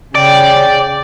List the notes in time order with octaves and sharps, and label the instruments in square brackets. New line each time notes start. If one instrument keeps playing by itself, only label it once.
[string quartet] C#3 G5 [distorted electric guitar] D5